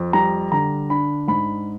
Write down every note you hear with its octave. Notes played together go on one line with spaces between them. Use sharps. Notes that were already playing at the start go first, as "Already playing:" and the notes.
Already playing: F2
G3 A#5
D3 A#5
D4 B5
G#2 B5